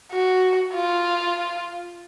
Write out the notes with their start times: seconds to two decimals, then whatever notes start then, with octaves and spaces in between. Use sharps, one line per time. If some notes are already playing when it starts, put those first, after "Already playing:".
0.12 F#4
0.74 F4